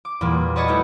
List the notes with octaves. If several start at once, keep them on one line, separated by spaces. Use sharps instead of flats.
D6
E2 A#2 G3 A#3
F#4 B4 D5 D#5 G#5 C#6
G3 A3 B3 E4 F#4 G4